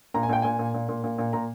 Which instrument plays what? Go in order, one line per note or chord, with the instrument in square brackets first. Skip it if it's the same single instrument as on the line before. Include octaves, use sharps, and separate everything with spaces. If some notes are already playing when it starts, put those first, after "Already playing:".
[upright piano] A#2 A#5
G#5
A#2 G5
A#2 G#5
A#2
A#2
A#2
A#2
A#2
A#2 A#5